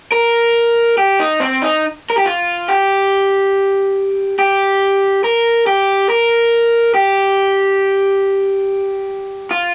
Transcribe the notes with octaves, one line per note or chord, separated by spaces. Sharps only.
A#4
G4
D#4
C4
D#4
A#4
G4
F4
G4
G4
A#4
G4
A#4
G4
F4